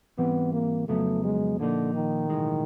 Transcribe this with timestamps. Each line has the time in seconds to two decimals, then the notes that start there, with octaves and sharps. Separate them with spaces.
0.18 G#2 E3 G3 B3 C4
0.53 A#3
0.88 F2 C#3 F#3 A3 B3
1.24 G#3
1.59 A#2 D3 F3 A#3 D#4
1.94 D#3
2.30 B1 A2 E3 G#3